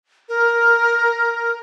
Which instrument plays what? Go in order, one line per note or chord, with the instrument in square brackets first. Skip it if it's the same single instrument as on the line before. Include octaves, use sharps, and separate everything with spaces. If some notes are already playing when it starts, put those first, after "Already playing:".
[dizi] A#4